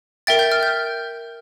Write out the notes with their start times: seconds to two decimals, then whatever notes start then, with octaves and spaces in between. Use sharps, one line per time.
0.27 A#4 E5 G5 A6
0.39 G6
0.52 F6
0.63 G6